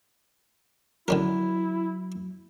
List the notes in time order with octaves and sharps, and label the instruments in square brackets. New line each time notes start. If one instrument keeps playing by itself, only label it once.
[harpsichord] D3 C#4 A#4 [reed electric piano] F#3 [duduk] E4